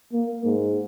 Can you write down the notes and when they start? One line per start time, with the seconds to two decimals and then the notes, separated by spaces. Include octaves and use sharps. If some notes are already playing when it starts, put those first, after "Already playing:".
0.13 A#3
0.45 G#2